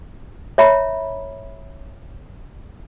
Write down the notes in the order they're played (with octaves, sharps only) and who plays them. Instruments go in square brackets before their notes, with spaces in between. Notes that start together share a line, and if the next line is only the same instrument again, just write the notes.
[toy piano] C#5 E5 A#5 B5